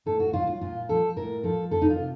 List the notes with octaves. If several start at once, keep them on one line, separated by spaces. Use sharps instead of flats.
A2 A4
F#4
F#3 F4
F4
A#2 F4
F3 A4
A2 A#4
F3 A4
F2 A4
D#4
F4
C3